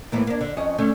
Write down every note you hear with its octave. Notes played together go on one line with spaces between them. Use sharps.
A2 E3 A#3
A#3 D4
D3
F2 C#4 D#5
D3 A3 C#4